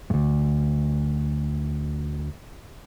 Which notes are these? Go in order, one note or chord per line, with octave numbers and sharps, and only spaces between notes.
D2 G2